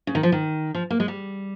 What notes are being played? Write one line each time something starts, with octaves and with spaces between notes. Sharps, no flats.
C#3
D#3
F3
D#3
F3
A#3
G#3
G3